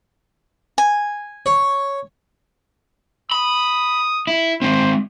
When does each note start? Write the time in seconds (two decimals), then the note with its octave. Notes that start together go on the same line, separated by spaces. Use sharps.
0.78 G#5
1.46 C#5
3.31 B5 D#6
4.27 E4
4.62 G#3 C4 C5